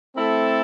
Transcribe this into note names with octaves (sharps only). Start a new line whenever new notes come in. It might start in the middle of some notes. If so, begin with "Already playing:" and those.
A3 C4 E4 A4